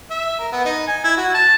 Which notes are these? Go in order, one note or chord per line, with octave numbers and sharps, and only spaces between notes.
E5
A#4
B3
D#4
G#5
E4
F#4
A5